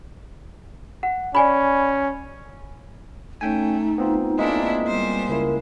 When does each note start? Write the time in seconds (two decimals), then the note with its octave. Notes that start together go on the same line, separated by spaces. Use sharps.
1.03 F#5
1.35 C#4 D5 G#5 B5
3.41 A3 C#4 D#4 G5 G#5
3.98 B3 C4 F4
4.38 G#3 A#3 D4 E4
4.87 G3 C5
5.29 C#2 E4 A#4